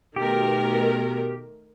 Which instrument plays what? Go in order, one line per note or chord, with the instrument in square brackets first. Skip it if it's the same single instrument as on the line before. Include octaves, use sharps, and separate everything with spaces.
[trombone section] B2 [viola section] D#3 A3 A#4 [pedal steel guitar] G4